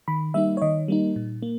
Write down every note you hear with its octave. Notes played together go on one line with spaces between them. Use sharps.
D#3 B5
G3 A#3 D#4 E5
C#5
D#3 D#5
G3 A#3 D#4
A#2
A#3